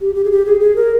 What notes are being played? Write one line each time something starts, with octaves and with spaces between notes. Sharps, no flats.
G4
G4
G#4
G4
G#4
G#4
A#4